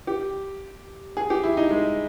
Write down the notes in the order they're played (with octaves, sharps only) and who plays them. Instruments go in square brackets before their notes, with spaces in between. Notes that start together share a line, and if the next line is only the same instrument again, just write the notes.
[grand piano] G4
G#4
G4
E4
D#4
G#3